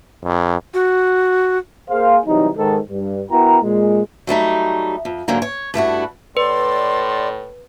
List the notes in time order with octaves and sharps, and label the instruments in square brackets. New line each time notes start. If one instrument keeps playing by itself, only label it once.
[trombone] F2
[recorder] F#4
[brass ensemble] A#3 G#4 C5 F5
C3 E3 F#3 G3 D#4
G#2 D#3 A4
G2
B3 E4 F#4 A#4 G5 A#5
A#2 G#3
[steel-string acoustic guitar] F#3 G3 A3 D#4
F2
G#2 D3 F#3 A#3
C#5
G2 A3 E4 F#4
[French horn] A2 [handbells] B4 [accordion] D5 [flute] C6